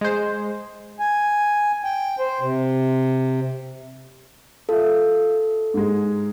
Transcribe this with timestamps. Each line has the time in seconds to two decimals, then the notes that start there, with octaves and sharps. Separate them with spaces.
0.01 G#3 C5
1.00 G#5
1.84 G5
2.19 C5
2.41 C3
4.69 F4 A4 E5
5.74 G#2 G#3